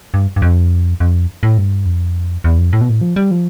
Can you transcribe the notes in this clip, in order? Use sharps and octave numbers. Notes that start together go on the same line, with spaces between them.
G2
G2
F2
F2
A2
G2
F2
E2
F2
A2
B2
A2
F3
G3
F3